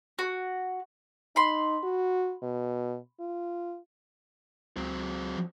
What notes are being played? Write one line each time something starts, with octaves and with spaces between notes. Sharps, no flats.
F#4
D#4 B5 C6
F#4
B2
F4
C#2 F#3 C4
F3